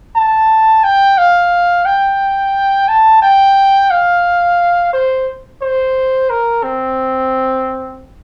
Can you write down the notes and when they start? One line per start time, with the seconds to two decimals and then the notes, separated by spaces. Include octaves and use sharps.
0.15 A5
0.84 G5
1.18 F5
1.86 G5
2.88 A5
3.22 G5
3.91 F5
4.93 C5
5.61 C5
6.30 A#4
6.63 C4